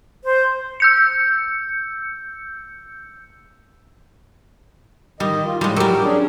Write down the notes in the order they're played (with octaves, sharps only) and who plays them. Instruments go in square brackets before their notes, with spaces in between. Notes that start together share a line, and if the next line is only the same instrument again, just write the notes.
[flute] C5
[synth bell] E6 G6 C#7
[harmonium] D#3 D#5 [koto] G3
[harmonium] F4
[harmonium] A2 [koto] G3 G#3
[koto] F#3 G3 [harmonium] G4 A#4
[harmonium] C#4 D4 G#4